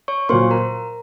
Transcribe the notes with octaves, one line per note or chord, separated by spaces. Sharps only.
C#5 C#6
A#2 F#3 A#3 C5 C6
A#4 A#5